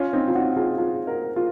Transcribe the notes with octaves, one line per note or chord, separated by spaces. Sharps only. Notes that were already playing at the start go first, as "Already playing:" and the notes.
Already playing: C#4 F4
C4 D#4
F4
D#4 F#4
F4 G#4
F4 G#4
F#4 A#4
F4 G#4